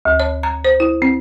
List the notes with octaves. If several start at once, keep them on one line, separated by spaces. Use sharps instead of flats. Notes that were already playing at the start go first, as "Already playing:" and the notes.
D2
C#5
A#5
C5
E4
C4